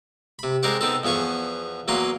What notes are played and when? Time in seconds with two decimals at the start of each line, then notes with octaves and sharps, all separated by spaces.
0.39 C3 B5
0.63 G#3 C4 A#4 C5 D5 F#5
0.81 B3 C4 D#4 A4
1.03 E2 F3 B3 G#4 C#6
1.88 E2 F#3 A#3 B4 C6